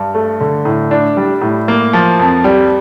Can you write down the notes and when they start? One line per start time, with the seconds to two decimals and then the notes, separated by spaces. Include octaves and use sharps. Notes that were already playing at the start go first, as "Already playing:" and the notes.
Already playing: G2
0.15 A3
0.40 D3
0.65 A2
0.91 D4
1.17 G3
1.42 A2
1.68 A#3
1.93 F3
2.19 F2
2.44 G3